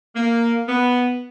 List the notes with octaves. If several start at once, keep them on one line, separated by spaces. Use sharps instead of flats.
A#3
B3